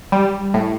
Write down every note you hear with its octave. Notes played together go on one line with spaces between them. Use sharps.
G3
A2